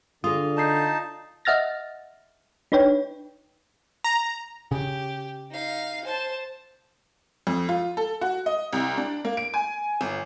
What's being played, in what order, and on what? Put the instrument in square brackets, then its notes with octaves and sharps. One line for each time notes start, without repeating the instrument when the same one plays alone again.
[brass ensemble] D3 [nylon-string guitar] F4 [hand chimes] G#4 D#6
[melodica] D#4 A5 [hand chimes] D#6 G6 C7
[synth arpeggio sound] D#5 E5 F#5 F6 A6 A#6
D4 D#4 B4 C#5 G5
[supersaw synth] A#5
[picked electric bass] C#3 [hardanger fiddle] G4
[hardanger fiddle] D#4 F5
C5 A5
[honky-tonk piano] F2
F4
A4
F#4
D#5
C2
D4
A#3
D7
G#5
G1